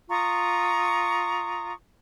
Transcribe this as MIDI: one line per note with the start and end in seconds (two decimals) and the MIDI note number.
0.10 1.73 65
0.10 1.73 82
0.10 1.73 85
0.10 1.73 87